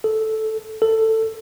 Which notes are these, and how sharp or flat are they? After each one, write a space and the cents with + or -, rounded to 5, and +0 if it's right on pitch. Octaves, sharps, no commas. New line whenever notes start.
A4 -5
A4 +15